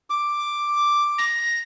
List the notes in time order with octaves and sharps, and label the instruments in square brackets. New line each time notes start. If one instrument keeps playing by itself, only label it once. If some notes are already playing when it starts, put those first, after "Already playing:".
[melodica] D6
[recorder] A#6